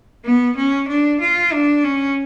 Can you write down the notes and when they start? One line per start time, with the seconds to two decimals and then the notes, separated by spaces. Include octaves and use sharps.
0.24 B3
0.56 C#4
0.88 D4
1.20 F4
1.52 D4
1.84 C#4